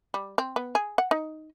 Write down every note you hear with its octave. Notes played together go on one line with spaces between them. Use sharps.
G3
C4
B3
G#4
F#5
D#4